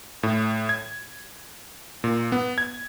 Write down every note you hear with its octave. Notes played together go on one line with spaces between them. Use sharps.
A2
G#6
A#2
B3
G#6